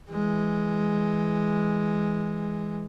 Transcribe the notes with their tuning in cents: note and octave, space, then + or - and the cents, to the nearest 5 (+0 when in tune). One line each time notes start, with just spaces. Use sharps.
E3 +0 G#3 +0